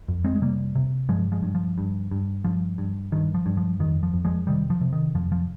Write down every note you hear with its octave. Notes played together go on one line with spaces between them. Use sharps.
F2
G#3 C4
G#3
C3 G3 A#3
C3
G2 F3 G#3
F3 G#3
G2
F3
G2
G2
G2 F3
G2
G2 D#3
F3
G2
F3
F2 D#3
F3
F2
F3 G#3
C3 D#3 G3
F3
C3
D#3
F2 F3
F3